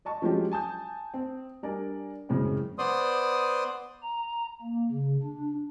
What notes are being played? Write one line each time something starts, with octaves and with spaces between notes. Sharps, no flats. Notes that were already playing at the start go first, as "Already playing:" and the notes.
D5 D#5 A5 C#6
F3 F#3 G#3 C#4 F4 G4
G#5 A5 D#6 G6
C4
G3 D4 A#4 D5 G#5
F#2 A2 C#3 G#3 C4
B3 C5 D5 C6 D#6
A#5
A#3
C#3
D4